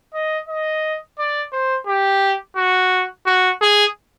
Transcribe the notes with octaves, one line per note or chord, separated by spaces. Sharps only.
D#5
D#5
D5
C5
G4
F#4
F#4
G#4